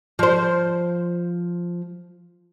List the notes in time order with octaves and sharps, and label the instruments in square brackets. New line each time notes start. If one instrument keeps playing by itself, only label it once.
[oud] F3 C5